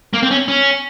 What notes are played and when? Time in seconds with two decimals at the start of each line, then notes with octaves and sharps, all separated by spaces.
0.14 A#3
0.23 C4
0.31 C#4
0.48 C#4